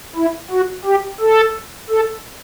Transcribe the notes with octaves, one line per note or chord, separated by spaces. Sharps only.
E4
F#4
G4
A4
A4